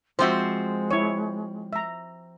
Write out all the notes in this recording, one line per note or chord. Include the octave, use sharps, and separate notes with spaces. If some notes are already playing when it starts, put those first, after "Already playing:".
F3 G#3 C4 F#4 C5 E5
E4 C#5
E5 A#5